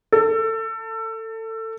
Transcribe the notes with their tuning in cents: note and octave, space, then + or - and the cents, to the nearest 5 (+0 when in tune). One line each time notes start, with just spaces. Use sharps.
A4 +25